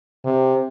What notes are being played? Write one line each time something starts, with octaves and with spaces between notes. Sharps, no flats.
C3